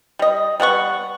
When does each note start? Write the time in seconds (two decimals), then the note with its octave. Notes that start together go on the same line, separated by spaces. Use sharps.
0.19 G3 D#5
0.60 G3 B3 F#5 C#6